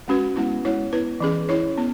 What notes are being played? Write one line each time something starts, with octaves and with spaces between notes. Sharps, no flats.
G#3 C#4 F#4 B4
G#3 B3 E4
G#3 E4 C#5
B3 E4 B4
E3 C#4 G#4
C#4 E4 C#5
B3